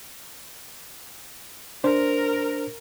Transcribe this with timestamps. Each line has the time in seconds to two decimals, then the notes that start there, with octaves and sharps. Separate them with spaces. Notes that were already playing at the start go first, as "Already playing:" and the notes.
1.84 D4 A#4 C5